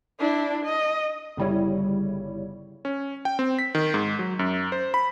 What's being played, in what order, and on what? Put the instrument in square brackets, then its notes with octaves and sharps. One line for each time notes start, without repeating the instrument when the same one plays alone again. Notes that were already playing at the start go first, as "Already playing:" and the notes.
[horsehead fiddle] D4 E4
D#5
[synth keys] G1 C#3 G3 E4 C#5
[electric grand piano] C#4
G5
C4
B6
D#3
G#2
F#3
F#2
C5
B5